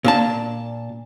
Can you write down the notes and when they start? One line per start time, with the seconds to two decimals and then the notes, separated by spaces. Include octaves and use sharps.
0.04 A#2 D4 A5